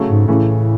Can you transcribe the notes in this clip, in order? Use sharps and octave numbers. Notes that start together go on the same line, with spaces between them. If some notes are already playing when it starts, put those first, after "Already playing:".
Already playing: C#3 F#3 A3
G#2
A2 C#3 E3 A3 C#4